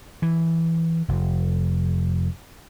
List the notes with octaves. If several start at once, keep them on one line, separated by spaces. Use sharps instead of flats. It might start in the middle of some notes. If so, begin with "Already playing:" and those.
E3
F1